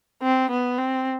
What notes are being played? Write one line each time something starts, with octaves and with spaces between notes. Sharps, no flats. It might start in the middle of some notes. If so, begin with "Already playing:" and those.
C4
B3
C4